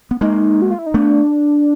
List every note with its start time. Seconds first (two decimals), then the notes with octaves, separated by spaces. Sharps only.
0.11 B3
0.21 G#3 A#3 D#4
0.62 F#4
0.71 F4
0.79 E4
0.86 D#4
0.94 A3 B3 D4